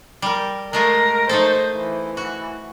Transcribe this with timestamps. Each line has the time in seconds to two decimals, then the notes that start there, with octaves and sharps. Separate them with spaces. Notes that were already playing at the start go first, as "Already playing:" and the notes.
0.22 G3 A#4
0.73 G#3 A3 F4 A#4
1.29 A3 D#4 A4 C5
1.76 E3
2.17 F#4